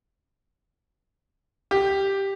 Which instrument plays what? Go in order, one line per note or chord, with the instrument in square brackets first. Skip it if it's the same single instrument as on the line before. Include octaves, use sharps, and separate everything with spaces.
[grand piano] G4